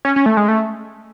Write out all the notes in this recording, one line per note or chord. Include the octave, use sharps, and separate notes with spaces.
C#4
C#4
A3
G#3
A3